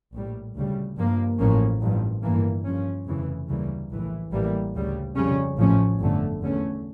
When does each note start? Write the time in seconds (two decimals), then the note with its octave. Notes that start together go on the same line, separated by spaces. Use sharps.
0.12 A#1 A2 G3
0.55 D2 C#3 G3
0.97 G2 F3 A#3
1.39 A1 A2 F3 A#3 C#4
1.81 A1 G2 F3
2.23 G1 G2 E3 A#3
2.65 G2 F3 C#4
3.06 F1 F2 C#3 E3
3.48 D2 C#3 E3 G3 A#3
3.90 A#1 A2 E3
4.31 A1 A2 E3 G3 A#3
4.74 D2 C#3 G3
5.16 F2 C#3 G3 C#4
5.57 A1 A2 F3 A3 C#4
6.00 G1 F2 D3 A3
6.41 E2 D3 A3 C#4